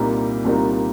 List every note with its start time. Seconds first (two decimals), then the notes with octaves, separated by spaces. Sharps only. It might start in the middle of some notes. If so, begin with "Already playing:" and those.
Already playing: C2 A#2 G3 A#3 D#4
0.45 C2 A#2 G3 A#3 D#4